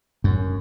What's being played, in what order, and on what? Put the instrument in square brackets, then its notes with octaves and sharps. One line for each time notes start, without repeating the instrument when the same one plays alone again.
[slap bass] F#2